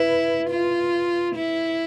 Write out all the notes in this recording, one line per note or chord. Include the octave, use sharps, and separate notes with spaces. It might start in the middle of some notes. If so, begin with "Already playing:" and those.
Already playing: E4 B4
F4
E4